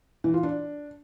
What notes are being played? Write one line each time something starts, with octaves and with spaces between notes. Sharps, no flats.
E3
F4
D4